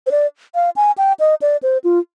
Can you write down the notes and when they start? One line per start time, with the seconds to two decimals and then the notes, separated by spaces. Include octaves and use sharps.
0.07 C5
0.11 D5
0.55 F5
0.76 G#5
0.98 G5
1.20 D#5
1.42 D5
1.63 C5
1.84 F4